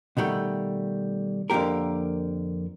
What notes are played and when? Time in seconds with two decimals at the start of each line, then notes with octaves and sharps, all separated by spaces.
0.17 B2 D#3 G3 A3
1.50 F2 D3 E3 A#3 G4 A#4